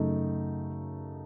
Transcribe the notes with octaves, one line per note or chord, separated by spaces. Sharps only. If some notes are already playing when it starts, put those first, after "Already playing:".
Already playing: F#2 C#3 A3 D#4